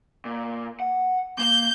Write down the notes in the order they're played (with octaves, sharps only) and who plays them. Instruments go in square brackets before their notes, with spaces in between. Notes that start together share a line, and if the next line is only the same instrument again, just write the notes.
[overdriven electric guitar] A#2
F#5
[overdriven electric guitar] A#3 [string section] G6